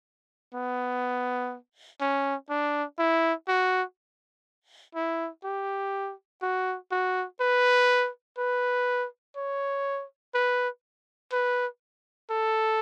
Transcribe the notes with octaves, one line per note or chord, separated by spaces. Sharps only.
B3
C#4
D4
E4
F#4
E4
G4
F#4
F#4
B4
B4
C#5
B4
B4
A4